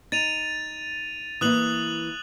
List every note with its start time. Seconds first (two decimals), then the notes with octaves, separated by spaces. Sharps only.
0.12 D#4 A6 D#7 F7
1.41 E3 A#3 E4 D#6 F#6 F#7